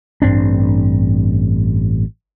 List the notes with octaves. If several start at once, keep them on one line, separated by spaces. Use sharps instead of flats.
A1 G2 C4 D4